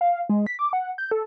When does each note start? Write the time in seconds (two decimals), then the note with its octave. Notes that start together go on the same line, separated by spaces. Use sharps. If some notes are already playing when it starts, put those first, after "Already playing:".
0.01 F5
0.29 G#3
0.47 B6
0.59 D6
0.73 F#5
0.98 G6
1.11 A4